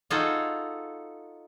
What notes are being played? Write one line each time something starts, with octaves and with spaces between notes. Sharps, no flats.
D#4 F4 F#4 G#4 A4 F5